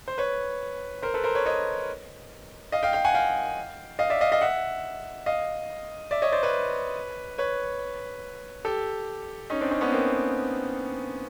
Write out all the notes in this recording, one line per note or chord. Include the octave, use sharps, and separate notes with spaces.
C5
B4 C#5
A#4 C5
A4 B4
A#4 C5
B4 C#5
C#5 D#5
D#5 F5
F5 G5
F5 G5
F#5 G#5
F5 G5
D#5 F5
D5 E5
D#5 F5
D#5 F5
E5 F#5
D#5 F5
D5 E5
C#5 D#5
C5 D5
B4 C#5
B4 C#5
G4 A4
C#4 D#4
C4 D4
C#4 D#4
B3 C#4
A#3 C4